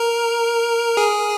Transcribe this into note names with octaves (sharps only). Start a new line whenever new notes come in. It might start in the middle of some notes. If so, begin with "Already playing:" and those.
Already playing: A#4
G#4